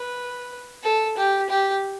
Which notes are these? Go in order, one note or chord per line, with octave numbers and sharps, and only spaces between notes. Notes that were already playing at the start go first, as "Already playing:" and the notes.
Already playing: B4
A4
G4
G4